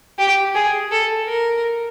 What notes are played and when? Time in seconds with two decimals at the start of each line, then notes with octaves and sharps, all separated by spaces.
0.18 G4
0.55 G#4
0.91 A4
1.27 A#4